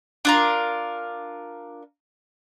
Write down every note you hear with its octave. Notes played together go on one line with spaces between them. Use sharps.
D4 F4 A#4